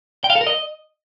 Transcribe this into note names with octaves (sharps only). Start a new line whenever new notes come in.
G5
F5
A4
A#4
D#5